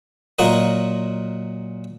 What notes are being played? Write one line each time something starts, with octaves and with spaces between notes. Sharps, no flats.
A#2 F#3 F4 F#4 A#4 D#5